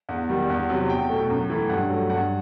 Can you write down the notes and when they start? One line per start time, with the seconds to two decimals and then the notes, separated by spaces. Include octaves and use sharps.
0.09 E2 F#5
0.29 D#3 G3
0.50 E2
0.69 C3 F#3
0.90 E2 G5
1.09 B2 A3
1.30 F#2
1.50 E3 A3
1.69 G2 F#5
1.90 F#3 A3
2.10 G2 F#5